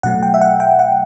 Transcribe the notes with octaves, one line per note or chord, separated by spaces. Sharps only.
B2 F#3 A3 F#5
G5
E5
F#5
G5
F#5